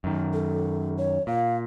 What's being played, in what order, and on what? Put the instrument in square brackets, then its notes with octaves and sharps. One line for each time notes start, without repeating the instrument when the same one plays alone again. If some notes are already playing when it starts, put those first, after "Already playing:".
[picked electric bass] F#2 D#3
[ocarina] A4
C#5
[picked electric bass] A#2 [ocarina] F5